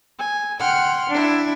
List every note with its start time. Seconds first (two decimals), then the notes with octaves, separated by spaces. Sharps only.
0.18 G#5
0.59 F#5 G5 C6 F6
1.09 D4 E4